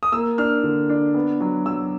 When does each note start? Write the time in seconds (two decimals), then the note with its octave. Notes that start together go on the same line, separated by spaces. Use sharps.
0.03 D#6
0.12 A#3 E6
0.38 D4 F6
0.64 D3
0.89 D4
1.14 B3
1.41 F#3
1.66 F#3 E6